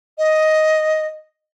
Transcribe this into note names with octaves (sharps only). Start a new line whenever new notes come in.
D#5